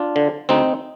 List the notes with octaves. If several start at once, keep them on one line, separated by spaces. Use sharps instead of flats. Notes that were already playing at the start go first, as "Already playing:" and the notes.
Already playing: D4 F4
D3
D2 C4 D#4